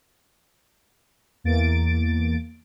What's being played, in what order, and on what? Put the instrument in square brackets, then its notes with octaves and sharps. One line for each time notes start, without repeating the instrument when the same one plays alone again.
[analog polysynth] E2 A#3 A6 D7